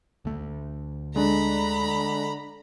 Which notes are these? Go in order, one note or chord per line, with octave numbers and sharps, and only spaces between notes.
D2 A3
D3 G#3 D4 A#5 B5